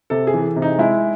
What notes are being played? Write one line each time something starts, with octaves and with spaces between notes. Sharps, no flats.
C3 A4
G#4
E3
C3
D#4
G#3 E4